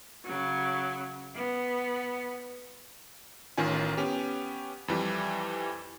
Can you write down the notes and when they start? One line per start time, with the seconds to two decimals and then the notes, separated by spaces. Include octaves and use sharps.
0.24 C#3 F#3
1.35 B3
3.58 A1 D#3 C#4 F4 G#5
3.97 B3 C#4 G4
4.88 F2 E3 G3